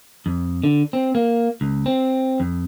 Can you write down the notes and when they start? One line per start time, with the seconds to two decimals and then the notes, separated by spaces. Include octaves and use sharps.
0.26 F2
0.64 D3
0.93 C4
1.15 A#3
1.61 C#2
1.86 C4
2.40 F2